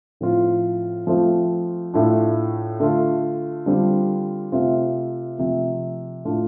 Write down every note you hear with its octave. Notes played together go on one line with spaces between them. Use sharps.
A2 F3 C4 F4
F3 A3 C4 F4
A2 A3 D4 F4
D3 A3 F4
D3 G3 C4 F4
C3 A3 C4 F4
C3 F3 A3
A2 A3 D4 F4